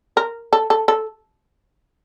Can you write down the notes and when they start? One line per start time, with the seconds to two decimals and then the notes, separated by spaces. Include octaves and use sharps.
0.17 A#4
0.53 A4
0.70 A4
0.88 A4